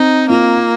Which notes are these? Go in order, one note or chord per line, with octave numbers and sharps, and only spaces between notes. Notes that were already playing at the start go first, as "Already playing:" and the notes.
Already playing: C4 D#4
A#3 F4